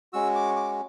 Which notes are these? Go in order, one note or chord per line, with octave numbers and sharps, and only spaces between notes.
G#3 C#4 F#4 E6
D6
D6